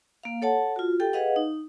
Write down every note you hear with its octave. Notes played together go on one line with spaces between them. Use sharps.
A#3 F5
A4 C#5 F#5 A5
F4 F#4
G4 A4 G5
G#4 B4 D#5 F5 F#5
D#4